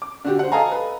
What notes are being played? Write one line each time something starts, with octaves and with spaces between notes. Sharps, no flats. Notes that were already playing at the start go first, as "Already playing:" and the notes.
D6
D3 F#4 G4
C5 F#5
A4 D#5 F5 G#5 A#5
B4